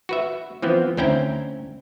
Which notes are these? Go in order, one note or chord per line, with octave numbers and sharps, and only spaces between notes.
F#4 B4 E5
E3 F3 B3 C4
D2 C4 C#4 E4 G5 A#5